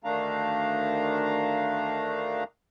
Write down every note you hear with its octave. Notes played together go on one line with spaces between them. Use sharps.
D2 D#3 A3 D4 F5 A#5